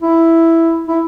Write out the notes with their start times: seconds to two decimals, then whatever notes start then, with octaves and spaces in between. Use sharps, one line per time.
0.02 E4
0.88 E4